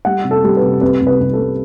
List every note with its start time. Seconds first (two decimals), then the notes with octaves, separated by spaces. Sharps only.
0.05 G3 F#5
0.24 C3
0.31 A4
0.44 G3
0.57 B4
0.62 C3
0.81 C2 B4
1.01 C2
1.07 B4
1.20 C2
1.33 A4
1.39 G3